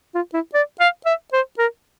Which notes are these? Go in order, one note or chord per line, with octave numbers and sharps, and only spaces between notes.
F4
E4
D5
F5
E5
C5
A#4